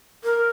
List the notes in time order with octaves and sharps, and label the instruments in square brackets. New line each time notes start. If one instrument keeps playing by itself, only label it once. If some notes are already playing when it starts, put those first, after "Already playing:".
[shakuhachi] A#4